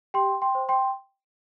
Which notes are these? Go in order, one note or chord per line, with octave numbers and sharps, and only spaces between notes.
G4 G5 C6
G5 C6
C5
G5 C6